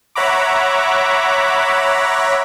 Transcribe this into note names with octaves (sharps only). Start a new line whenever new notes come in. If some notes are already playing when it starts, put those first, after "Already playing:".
C#5 E5 F#5 A#5 B5 D6